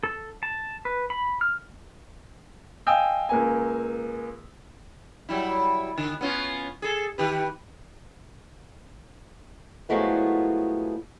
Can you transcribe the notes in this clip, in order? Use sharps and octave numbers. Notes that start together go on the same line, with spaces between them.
A4
A5
B4
B5
F6
D#5 F5 G5 G#5 D#6 E6
C#2 A#3 G#5
F#3 G3 E4
D3
B3 C#4 F4
G#4 A4
D#3 G4 B4
A2 F3 F#3 G#3 A3 B3